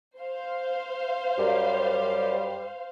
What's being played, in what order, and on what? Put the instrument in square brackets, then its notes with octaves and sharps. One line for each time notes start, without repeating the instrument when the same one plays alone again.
[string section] C5 F5
[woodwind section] F#2 G3